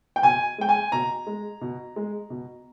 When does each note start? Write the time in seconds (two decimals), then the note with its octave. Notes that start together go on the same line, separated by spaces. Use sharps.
0.16 G5
0.23 B2 G#5
0.58 G#3 G5
0.69 G#5
0.92 B2 A#5
1.27 G#3
1.61 B2
1.96 G#3
2.30 B2